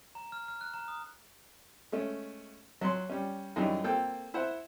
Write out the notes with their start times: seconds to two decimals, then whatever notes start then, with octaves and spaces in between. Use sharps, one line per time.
0.15 A#5
0.32 F6
0.48 F6
0.61 F#6
0.74 A#5
0.88 D#6
1.92 G#3 A3 C#4
2.81 F#3 C6
3.09 G3 C#4
3.56 F#2 C#3 E3 G3 D#4
3.84 A#3 C4 A4 G5
4.34 E4 C5 F#5